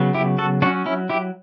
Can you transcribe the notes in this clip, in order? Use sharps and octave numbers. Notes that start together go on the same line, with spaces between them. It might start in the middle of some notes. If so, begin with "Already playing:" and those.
Already playing: C#3 F#3 B3
E4 G4
F#4 A4
F#3 C#4 D4 F#4
C#4 E4
E4 G4